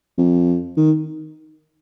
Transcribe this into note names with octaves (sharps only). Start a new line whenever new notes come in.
F2
D#3